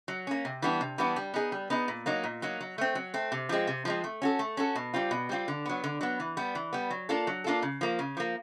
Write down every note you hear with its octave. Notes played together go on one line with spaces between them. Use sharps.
F#3
A#3 C#4
C3
E3 G3 B3 D4
C3
E3 G3 B3 D4
G3
B3 D#4 G#4
G3
B3 D#4 G#4
A#2
F#3 A#3 D#4
A#2
F#3 A#3 D#4
F#3
A3 C4
F#3
A3 C4
C3
F3 G#3 C4
C3
F3 G#3 C4
A3
C#4 F#4 A4
A3
C#4 F#4 A4
B2
G3 C4 F4
B2
G3 C4 F4
D3
F#3 B3
D3
F#3 B3
E3
G3 B3
E3
G3 B3
F#3
A#3 D4 F4 A4
F#3
A#3 D4 F4 A4
C#3
F3 A#3
C#3
F3 A#3